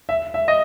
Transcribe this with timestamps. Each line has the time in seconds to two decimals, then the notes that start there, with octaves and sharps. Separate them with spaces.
0.09 E5
0.34 E5
0.48 D#5